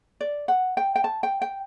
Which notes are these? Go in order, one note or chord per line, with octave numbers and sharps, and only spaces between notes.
D5
F#5
G5
G5
A5
G5
G5